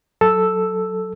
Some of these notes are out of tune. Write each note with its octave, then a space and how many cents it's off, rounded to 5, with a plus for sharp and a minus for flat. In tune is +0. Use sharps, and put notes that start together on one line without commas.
F#3 +0 A4 +0 E6 +0